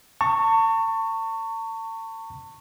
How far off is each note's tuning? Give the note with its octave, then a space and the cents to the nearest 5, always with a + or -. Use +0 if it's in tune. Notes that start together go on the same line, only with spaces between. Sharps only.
A5 +40 C#6 +0